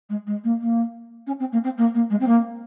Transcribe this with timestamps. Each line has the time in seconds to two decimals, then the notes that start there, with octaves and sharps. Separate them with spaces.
0.09 G#3
0.26 G#3
0.43 A#3
0.60 A#3
1.26 C#4
1.39 C4
1.52 A#3
1.63 C4
1.77 A#3
1.94 A#3
2.10 G#3
2.20 C4
2.27 A#3